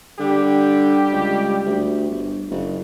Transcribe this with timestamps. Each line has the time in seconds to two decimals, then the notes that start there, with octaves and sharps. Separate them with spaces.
0.20 D3 G3 G4
1.12 C#2
1.66 D2
2.09 G1
2.51 F#1